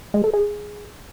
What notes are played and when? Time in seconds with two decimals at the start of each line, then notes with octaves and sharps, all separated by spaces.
0.14 G#3
0.24 A4
0.33 G#4